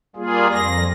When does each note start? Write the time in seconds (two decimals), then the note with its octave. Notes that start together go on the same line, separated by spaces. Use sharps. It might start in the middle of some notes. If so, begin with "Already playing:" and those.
0.16 G3 A#3 F4 G#4
0.52 F2 A#6